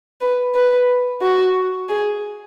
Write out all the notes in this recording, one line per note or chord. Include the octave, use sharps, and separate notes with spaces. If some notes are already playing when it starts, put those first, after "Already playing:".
B4
B4
F#4
G#4